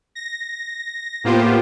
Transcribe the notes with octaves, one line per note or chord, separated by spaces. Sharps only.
A#6
A2 A#3 B3 F4 G4 C5